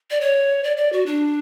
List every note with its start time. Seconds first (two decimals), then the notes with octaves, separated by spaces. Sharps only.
0.11 D5
0.21 C#5
0.64 D5
0.77 D5
0.92 F#4
1.06 D4